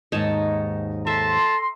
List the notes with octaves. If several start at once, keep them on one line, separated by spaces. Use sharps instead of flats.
D#2 G#2 D#4 C#5 A5
A4 E5 A5 A#5 C6